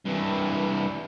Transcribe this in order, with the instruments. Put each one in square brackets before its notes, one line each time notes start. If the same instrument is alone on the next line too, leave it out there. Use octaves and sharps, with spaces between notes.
[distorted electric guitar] G2 E3